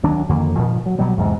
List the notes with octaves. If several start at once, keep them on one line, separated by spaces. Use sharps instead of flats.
D2 D#3 F#3 D4
F2 D3 D#3 A#3
G2 A#2 D#3 F3
F#3
B2 F#3 G3
E2 G#2 C3